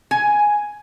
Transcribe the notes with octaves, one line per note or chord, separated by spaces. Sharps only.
G#5